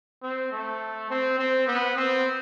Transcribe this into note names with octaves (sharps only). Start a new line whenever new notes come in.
C4
A3
C4
C4
B3
C4